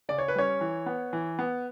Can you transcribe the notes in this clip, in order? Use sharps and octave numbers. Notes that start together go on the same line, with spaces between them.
C#3 D5
C#5
B4
G3 C#4 C#5
E3
B3
E3
B3